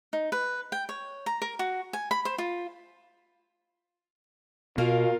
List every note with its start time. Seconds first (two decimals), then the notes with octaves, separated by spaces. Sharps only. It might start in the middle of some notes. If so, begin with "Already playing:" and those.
0.13 D#4
0.32 B4
0.72 G5
0.89 C#5
1.26 A#5
1.42 A#4
1.59 F#4
1.93 G#5
2.11 B5
2.25 C5
2.38 F4
4.78 B2 A#3 F4 A#4 F5